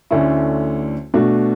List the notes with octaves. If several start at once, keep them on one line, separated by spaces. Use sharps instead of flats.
D2 D3 A3 C#4 E4
B2 A3 D4 F#4